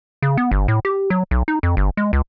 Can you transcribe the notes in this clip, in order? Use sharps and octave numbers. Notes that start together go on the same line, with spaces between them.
C#3
B3
G1
A2
G4
F#3
B1
D#4
F2
G1
G#3
C#2